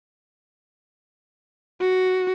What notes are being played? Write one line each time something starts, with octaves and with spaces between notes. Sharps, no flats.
F#4